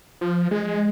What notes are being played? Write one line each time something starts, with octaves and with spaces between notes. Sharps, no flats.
F3
G#3